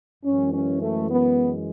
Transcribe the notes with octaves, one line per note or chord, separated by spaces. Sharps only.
F#2 E3 G#3 C#4
C#4
A3
B3